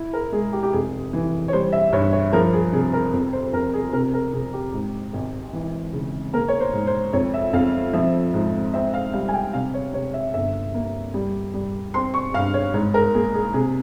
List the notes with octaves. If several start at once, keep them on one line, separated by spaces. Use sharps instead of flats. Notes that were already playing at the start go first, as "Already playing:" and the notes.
Already playing: E4
A#4
G#3 G#4
G4
G4
F1 G#4
E3
C#5
G3 C5
E5
G2 C#5
C#5
F3 A#4
G#4
C3 G#4
A#4
F2
C5
F2 A#4
G#4
C3 A#4
A#4
C3 G#4
G4
G#2
G#1
E3
C#3
A#3 A#4
C#5
C5
G#2
C5
F2 C#5
E5
F2 F5
F3 E5
G#2
C4 E5
F5
G3 F5
G#5
G5
C3 F5
C#5
C3 C#5
E5
G1 E5
A#3
G3
G3
C4 C6
C#6
G2 F5
C#5
G#2 C#5
A#4
A#3 G#4
G#4
C3 G#4